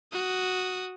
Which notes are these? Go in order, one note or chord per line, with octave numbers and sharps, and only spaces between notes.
F#4 D#6